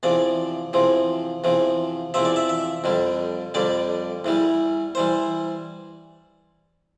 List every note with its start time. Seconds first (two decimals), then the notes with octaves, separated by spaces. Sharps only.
0.03 E2 C3 F3 D5
0.73 E2 C3 F3
1.44 E2 C3 F3
2.14 E2 C3 F3 E5
2.25 D5
2.36 E5
2.49 E5
2.84 F2 D3 G3
3.54 F2 D3 G3 D5
4.25 E2 E3 G3
4.95 E3 G3 C5